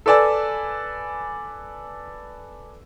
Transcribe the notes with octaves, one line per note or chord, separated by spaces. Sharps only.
A4 B4 D5 G#5 E6